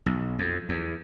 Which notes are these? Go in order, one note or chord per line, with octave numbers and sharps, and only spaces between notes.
B1
F2
E2